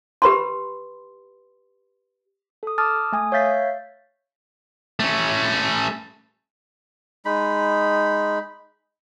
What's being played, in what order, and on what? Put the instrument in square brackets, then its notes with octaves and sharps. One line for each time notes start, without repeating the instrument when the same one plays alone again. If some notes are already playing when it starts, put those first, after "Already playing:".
[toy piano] G4 B4 B5 C6
[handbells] A4 D#6
A5 D6 D#6 F6 A6
A3 G#5 D#6
C#5 E5 F5 G6 A6 B6
[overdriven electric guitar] A3 C#4
[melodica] G#3 D#4 B5